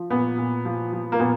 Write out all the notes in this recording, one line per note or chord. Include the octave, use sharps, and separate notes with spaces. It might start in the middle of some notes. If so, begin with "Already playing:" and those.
Already playing: F3
A#2 B3
A#2
F3
F3
A#3
A#2 B3